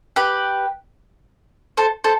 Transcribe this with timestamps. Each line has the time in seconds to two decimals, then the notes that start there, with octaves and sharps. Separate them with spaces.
0.16 G4 B4
1.77 A4 C5
2.04 A4 C5